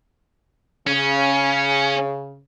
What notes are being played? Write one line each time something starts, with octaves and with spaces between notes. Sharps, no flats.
C#3 C#4